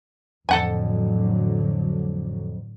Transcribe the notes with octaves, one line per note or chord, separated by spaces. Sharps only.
A1 F2 D3 F#3 A4 F#5 G#5